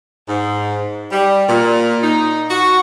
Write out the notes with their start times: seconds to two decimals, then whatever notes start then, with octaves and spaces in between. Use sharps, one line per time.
0.29 G#2
1.12 G3
1.49 A#2
2.03 D#4
2.50 F#4